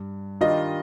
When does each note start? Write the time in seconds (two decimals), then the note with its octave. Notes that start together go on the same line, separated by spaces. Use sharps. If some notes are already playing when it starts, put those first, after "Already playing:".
Already playing: G2
0.41 D#3 G3 D4 F4 D#5